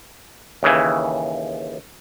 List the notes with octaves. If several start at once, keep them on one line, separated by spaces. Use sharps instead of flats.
D#2 C#3 E3